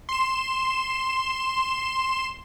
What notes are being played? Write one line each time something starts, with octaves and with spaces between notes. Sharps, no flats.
C6 E7